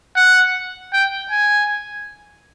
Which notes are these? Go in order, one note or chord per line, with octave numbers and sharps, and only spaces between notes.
F#5
G5
G#5